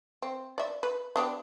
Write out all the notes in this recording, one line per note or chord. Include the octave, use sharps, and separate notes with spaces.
C4
D5 E5
B4
B3 D4 G4